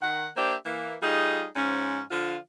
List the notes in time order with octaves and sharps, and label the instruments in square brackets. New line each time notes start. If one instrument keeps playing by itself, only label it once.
[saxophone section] D#3 F#5
A#3 D4 G4 C5 E5
E3 A#3
G3 A3 D#4 F4 G#4
G#2 F3 C#4
D3 F3 F4